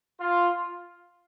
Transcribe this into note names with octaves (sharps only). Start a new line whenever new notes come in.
F4